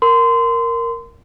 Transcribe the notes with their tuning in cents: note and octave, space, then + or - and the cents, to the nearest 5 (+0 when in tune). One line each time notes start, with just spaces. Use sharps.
A#4 +0 C6 -25